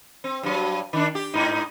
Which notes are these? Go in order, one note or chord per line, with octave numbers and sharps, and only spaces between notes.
C4
G2 F#3
D#3 D4
G4
G#2 D#4